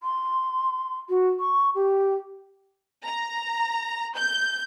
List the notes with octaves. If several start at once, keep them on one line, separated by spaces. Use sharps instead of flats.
C6
F#4
C#6
G4
A#5
G6